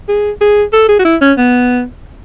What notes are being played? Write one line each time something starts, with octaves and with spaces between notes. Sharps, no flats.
G#4
G#4
A4
G#4
F#4
E4
C#4
B3